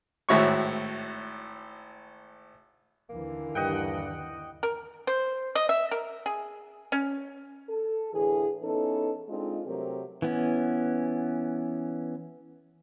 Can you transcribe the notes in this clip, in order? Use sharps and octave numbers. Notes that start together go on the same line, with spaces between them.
G#1 A2 E4 F#4 C#5 C#6
D#2 D3 E3 A#3
G2 D#5 F#5 G5
A#4
C5
D#5
E5
A#4
G#4
C#4
A4
A2 D3 E3 G#4
E3 B3 C#4 D#4 A4
G#3 C4 D4 D#4 F4
C3 F#3 A3 C4 G4 A#4
E3 B3 C#4